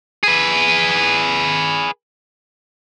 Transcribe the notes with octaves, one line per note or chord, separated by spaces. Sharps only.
G#4 B4